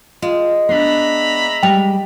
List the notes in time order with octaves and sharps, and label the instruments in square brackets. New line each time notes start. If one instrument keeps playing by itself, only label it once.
[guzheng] G#3 [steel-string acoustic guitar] F4
[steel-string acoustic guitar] B3 D4 [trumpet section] E5 A#5 B5
[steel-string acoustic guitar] G3 G#3 [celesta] G5 F7